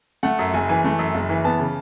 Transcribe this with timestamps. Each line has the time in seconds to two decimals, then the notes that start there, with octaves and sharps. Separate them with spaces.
0.23 A3 F#5
0.39 F#2
0.54 F#1 G#5
0.69 E3 G#5
0.84 A3
0.99 F#2
1.14 F#1
1.30 E3
1.44 B3 A5
1.59 C#3